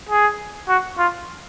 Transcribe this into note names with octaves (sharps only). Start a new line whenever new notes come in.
G#4
F#4
F4